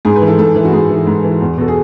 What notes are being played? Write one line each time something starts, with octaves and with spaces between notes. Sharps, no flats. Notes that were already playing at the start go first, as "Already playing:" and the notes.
G#2 G#4
B4
E3
A4
G#2 A4
E3
F#4
G#2 G#4
E3
G#2
E3
E2
B2 A4
G#4